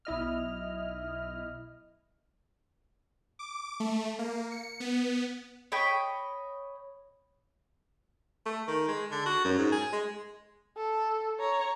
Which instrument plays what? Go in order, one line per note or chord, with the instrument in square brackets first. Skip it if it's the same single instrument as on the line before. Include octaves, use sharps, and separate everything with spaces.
[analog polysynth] B1 E4 D#5 F6
[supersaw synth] D6
A3
A#3
C#7
B3
[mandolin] C#5 D#5 G5 B5
[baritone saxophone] A3
D#3
G#3
D3
F#4
F#2
G#2
G#4
G#3
[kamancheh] A4
C#5 A#5